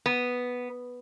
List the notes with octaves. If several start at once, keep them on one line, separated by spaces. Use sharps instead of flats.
B3